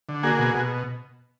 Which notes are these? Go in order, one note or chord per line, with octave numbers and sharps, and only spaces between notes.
D3
A#3 F#4 G#4
B2
B2